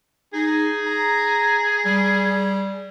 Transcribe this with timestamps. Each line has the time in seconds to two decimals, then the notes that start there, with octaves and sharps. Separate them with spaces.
0.34 D#4 G#4
0.86 A#5
1.86 G3